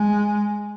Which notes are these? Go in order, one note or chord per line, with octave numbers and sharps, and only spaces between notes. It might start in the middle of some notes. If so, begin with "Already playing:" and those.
Already playing: G#3